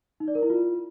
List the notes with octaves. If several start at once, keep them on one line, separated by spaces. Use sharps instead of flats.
D#4
D5
A#4
E4
F4